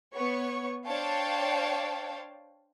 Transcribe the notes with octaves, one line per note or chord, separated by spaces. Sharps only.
B3 C#5 C#6
D4 C5 C#5 F5 G5 A5